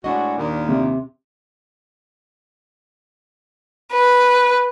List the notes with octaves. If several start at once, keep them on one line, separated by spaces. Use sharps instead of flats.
A2 G#3 D4 F#4 D#5
D#2 A#2
C3
B4